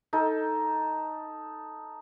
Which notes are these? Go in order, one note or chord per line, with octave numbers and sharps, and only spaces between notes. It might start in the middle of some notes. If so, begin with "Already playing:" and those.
D#4 A4